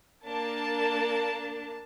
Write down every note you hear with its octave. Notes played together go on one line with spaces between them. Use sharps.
A#3 D4 A5